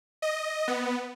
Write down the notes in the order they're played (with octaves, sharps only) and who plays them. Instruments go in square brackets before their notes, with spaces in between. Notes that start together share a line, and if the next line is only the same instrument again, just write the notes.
[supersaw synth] D#5
B3